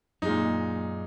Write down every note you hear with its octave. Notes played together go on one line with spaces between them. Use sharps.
F#2 A#2 F#3 G#3 D#4